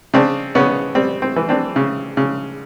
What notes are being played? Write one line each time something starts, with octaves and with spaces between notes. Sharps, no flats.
C#3 C4 D4
C#3 B3 C#4
G3 C4
C4
E3
C4 D4
C#3
C#3